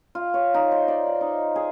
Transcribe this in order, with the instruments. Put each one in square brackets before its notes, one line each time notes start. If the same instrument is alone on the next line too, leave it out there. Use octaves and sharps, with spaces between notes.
[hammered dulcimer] F4
C#5
D#4
C5
D5
F5
D#4
G#4